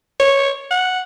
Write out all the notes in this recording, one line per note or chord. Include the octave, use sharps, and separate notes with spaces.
C#5
F#5